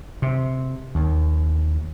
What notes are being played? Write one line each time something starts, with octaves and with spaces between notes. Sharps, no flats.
C3
D#2